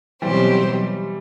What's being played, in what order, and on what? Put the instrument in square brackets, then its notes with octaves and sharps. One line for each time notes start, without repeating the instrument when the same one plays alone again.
[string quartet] B2 F#3 C4 G4 C5 [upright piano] E3 G3